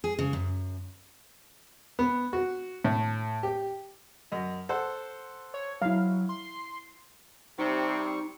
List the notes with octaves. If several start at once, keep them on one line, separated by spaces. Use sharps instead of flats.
G#4
C#3
F#2
B3
F#4
A2
G4
F#2 D#5
A4 C5 F#5
C#5
F#3 E4 F5
C6
C3 G3 C4 D#4 C#6